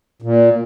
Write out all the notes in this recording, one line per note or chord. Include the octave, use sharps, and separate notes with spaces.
A#2